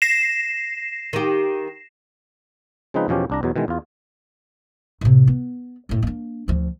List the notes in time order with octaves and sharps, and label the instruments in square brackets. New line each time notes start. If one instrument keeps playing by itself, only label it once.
[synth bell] A#6 C7 E7
[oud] D#3 G4
[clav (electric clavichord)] C#3 F3 G#3 C4 D#4 B4
E2 B2 F3 C#4 G4
C2 D4 A#5
E2 B2 F#3
B2 D#3 E3 G#3
E2 F4
[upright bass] A2 C3
B3
F#2 A2
A#3 D4
D2 F3